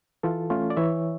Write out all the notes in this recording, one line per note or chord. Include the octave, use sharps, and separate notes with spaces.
E3 F4 A4
A3 C#4 F4
D5
E3 C#5 E5